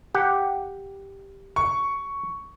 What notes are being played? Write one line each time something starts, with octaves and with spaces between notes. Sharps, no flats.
G4 F#5
C#6